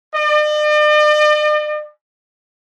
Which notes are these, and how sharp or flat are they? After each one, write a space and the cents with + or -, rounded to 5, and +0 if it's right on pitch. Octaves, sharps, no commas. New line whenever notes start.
D5 +45